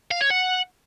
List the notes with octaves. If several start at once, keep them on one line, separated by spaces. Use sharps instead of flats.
F5
C#5
F#5